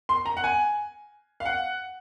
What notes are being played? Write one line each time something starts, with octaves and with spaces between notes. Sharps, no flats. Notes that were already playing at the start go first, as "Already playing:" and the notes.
C6
A#5
F#5
G#5
F5
F#5